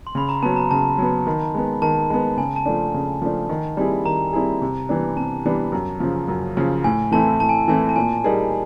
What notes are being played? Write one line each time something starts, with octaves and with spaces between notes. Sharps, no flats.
C6
C#3 B5
A#5
F#3 B3 A5
A#5
C#3 A5
F#3 B3
D#3
G#3 B3
D#3 A5
G#3 B3
C#3 G#5
A5
F3 A3 D4
C#3
F3 A3 D4
D#3
G3 C4 E4 G#4
D#3 A#5
G3 C4 E4 G#4
C3
E3 G3 B3 D4
C3 A5
E3 G3 B3 D4
F#2
C#3 F3
F#2
C#3 F3
A2 G#5
E3 A3 C4 E4 A5
A2 A5
G#5
E3 A3 C4 E4 G#5
A5
A#2 G#5
G3 A#3 D#4 G#4